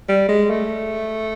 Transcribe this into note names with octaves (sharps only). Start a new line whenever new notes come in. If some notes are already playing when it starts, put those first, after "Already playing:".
G3
G#3
A3